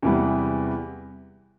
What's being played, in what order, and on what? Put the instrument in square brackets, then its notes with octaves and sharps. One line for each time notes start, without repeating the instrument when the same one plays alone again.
[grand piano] E2 C3 E3 G3 B3